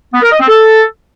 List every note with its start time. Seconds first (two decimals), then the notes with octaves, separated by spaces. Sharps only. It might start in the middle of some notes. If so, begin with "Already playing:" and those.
0.13 B3
0.22 A#4
0.31 D#5
0.39 C4
0.48 A4